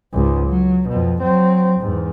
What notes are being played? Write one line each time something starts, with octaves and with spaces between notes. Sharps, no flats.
C#2 G#2
F#3
F2 B2
F#3 C4
E2 G#2